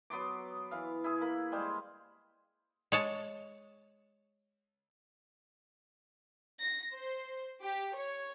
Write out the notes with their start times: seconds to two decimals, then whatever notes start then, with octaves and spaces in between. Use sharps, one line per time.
0.10 F#3 B3 C6 D6
0.71 E3 F5
1.04 E4 G#4
1.21 A#3 B5
1.52 G3 G#3 C5 F5
2.92 G#3 C#5 A5
6.60 A#6
6.92 C5
7.61 G4
7.96 C#5